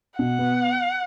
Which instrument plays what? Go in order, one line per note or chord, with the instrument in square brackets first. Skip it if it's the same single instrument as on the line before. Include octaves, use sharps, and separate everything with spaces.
[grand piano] B2 [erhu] F#5
[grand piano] B3